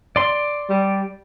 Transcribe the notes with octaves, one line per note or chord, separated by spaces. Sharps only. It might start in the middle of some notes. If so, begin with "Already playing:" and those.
D5 C6
G3